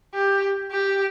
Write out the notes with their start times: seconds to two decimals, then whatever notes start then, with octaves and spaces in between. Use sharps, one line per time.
0.14 G4
0.71 G4